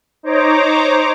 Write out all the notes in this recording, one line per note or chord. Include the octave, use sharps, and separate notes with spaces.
D#4 C5 C#5 A#5 D6